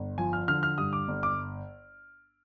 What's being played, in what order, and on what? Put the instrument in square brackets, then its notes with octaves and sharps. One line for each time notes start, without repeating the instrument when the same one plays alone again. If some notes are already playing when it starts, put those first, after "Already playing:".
Already playing: [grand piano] G1
F3 G#5
F6
D3 F6
F6
G2 D#6
D6
G1
D6